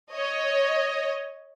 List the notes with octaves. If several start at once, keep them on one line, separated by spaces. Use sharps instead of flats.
C#5 D#5